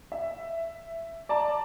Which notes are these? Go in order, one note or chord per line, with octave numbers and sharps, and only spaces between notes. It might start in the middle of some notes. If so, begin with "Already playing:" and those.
E5
D5 A5 A#5